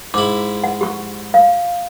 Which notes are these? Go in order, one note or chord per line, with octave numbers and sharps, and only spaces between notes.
G#2 E4 D6
F#5
G4 C#6
F5